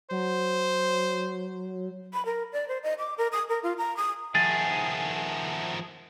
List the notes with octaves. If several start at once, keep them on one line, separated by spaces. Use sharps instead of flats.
F#3 C5
B5
A#4
D5
C5
D#5
D6
A#4
D#6
A#4
F4
A#5
D#6
D#3 F3 G#4 E5 F#5 A5 A6